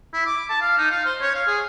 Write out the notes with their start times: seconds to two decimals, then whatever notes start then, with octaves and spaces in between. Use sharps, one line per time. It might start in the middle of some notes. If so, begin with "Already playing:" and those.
0.13 E4
0.26 D6
0.50 A5
0.62 F5
0.78 D#4
0.91 F5
1.06 C5
1.21 C#5
1.35 F5
1.47 G#4